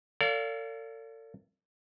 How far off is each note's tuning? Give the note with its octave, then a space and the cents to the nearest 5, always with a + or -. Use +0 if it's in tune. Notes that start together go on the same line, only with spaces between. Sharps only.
A4 +40 D5 -40 F5 +0